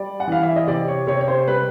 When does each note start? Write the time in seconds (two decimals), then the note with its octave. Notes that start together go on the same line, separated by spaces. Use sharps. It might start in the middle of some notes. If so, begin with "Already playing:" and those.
Already playing: G3 D5
0.20 F#5
0.27 E3 F5
0.43 E5
0.56 D#5
0.67 C3 D5
0.88 C#5
1.07 C3 C#5
1.21 C#5
1.28 C5
1.48 G3 B4